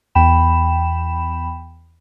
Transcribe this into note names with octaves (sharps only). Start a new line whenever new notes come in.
E2 G5 B5 E7